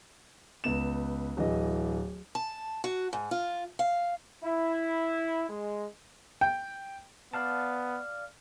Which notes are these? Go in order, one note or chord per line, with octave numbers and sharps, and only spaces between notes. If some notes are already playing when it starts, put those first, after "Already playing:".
C#2 B3 E7
D1 E3 D#5
A5
F#4
G#2
F4
F5
E4
G#3
G5
B3 D5 F5 A5